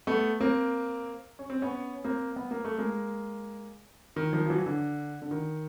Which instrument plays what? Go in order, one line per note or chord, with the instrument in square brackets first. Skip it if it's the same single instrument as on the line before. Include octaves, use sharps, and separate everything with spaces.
[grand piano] A3 B3
A#3 C4
C#4
C4
B3 C#4
A#3 C4
B3
A#3
A3
G#3 A#3
D#3
D#3 F3
F3
E3 F#3
D3
D3
D#3